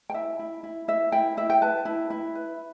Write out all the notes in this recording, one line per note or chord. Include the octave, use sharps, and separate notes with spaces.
G5
E4 E5
E4
E4
E4 E5
E4 G5
E4 E5
G5
B4 A5
E4
E4
B4